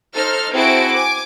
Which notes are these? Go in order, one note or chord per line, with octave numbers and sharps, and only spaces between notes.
D#4 A4 C5 F6
C4 E4 F#4 G#4 A5 D7
G#5 D6